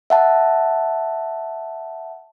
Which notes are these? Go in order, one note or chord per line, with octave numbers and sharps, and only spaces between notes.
E5 F#5 A5